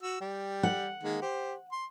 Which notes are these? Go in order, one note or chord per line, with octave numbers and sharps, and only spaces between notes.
F#4 E6
G3 G5
F#5
D#3 G#3 A#3
G4 C5
C6